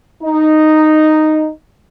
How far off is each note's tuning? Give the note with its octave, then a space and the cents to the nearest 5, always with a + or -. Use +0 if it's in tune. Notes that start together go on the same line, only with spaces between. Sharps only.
D#4 -5